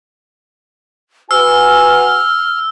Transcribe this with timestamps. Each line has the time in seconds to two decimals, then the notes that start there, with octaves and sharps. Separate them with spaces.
1.31 F#4 B4 G#5 E6 F6